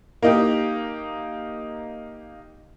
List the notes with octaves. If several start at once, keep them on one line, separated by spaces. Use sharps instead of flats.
A#3 D#4 G4